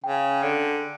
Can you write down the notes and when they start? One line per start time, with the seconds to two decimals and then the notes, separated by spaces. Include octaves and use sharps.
0.04 C#3 G5
0.43 D3